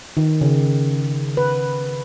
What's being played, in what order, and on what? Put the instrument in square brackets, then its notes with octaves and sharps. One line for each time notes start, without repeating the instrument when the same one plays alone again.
[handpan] D#3
C#3
B4